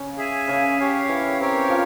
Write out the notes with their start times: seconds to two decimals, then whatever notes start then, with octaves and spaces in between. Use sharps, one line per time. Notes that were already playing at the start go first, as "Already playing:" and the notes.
Already playing: C#3 C#4
0.18 G#4 E5 G#5
0.48 C#3 C#4
0.79 G4 C#5 F5
1.09 E3 E4
1.39 C4 G4 A#4 C#5
1.69 F3 F4